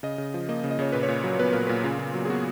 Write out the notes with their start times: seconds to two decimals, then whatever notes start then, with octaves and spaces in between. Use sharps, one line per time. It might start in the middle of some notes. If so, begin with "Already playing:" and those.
0.03 C#3 D#5
0.18 C#3
0.34 F3
0.49 A#3 D#5
0.64 C#3
0.71 D#5
0.79 C#3 C#5
0.92 A#2 B4
1.03 C#5
1.08 A#2
1.24 F#3
1.39 B3 B4
1.53 A#2 A#4
1.67 A#2 B4
1.84 C#3 F4
1.99 C#3
2.14 F#3
2.25 G#4
2.29 B3 F#4